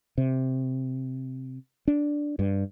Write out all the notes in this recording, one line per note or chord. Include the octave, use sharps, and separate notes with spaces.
C3
D4
G2